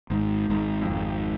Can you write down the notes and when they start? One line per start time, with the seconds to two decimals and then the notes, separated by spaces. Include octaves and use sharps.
0.10 G#1 G#2
0.50 G#1 G#2
0.82 F2
0.90 G#1 G#2